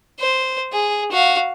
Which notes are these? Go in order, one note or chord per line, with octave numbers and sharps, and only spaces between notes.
C5
G#4
F#4 F5